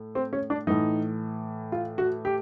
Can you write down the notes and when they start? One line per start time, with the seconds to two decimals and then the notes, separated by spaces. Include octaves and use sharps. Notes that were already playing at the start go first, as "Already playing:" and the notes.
Already playing: A2
0.15 C4
0.33 C#4
0.50 D4
0.67 A2 E3 D#4
1.72 F4
1.98 F#4
2.25 G4